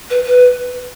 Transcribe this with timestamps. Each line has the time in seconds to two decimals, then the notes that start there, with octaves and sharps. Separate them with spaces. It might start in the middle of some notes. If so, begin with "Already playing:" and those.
0.10 B4
0.26 B4